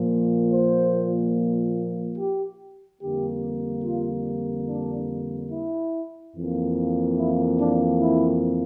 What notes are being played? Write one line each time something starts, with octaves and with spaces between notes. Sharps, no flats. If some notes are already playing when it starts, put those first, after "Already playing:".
Already playing: A#2 F3 A#3
C5
G4
F2 D3 G3 A#3 G4
F4
D4
E4
F2 E3 A#3
E4
D4
E4